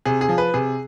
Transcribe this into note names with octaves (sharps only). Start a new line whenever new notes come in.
C3 G#4
G#4
F3
B4
C3 G#4